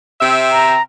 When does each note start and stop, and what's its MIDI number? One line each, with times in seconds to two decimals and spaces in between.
0.21 0.75 48
0.21 0.75 60
0.21 0.75 76
0.52 0.82 82